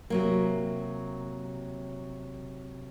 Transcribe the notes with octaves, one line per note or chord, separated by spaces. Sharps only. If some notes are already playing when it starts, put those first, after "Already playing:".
C3 F#3 A#3